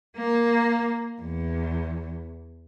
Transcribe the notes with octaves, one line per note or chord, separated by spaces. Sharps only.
A#3
E2